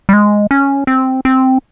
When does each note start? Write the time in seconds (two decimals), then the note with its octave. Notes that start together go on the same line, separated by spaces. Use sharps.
0.09 G3
0.13 G#3
0.51 C#4
0.87 C4
1.25 C4